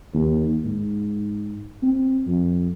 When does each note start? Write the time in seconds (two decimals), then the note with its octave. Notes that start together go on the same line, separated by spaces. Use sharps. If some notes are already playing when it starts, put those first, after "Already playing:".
0.14 D#2
0.65 G#2
1.83 C4
2.27 F2